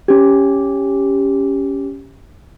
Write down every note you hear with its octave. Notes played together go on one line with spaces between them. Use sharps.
C#4 G4